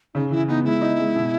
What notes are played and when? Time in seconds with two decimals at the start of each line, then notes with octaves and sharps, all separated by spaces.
0.14 C#3 D#4
0.31 E3 E4
0.48 B3 D#4
0.65 G#3 E4
0.81 D#4
0.99 G#3
1.16 B2